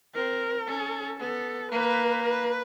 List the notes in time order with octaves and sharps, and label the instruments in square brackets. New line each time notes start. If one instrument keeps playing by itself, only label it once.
[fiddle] C4 [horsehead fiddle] A#4
[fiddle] C#4 [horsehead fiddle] A4
[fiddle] B3 [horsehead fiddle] A4
[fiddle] A#3 [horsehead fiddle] B4
[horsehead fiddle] B4